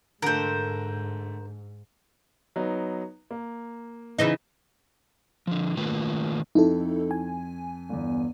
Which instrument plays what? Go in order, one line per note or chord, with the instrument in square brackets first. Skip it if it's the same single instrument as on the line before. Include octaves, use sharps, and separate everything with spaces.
[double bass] G#2 [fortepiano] D3 A3 [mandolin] A#4 C5
[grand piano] F#3 B3 D#4
A#3
[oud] C#3 E3 D#4
[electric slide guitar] D3 F3
D#3 A3 A#3 F4 B4
[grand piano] F2 [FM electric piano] D#4 E4 A4
[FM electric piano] G#5
[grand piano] G1 E2